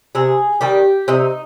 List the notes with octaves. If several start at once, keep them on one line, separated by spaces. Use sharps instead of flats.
C3 G#4
D#3 G3 G4
C3 D#4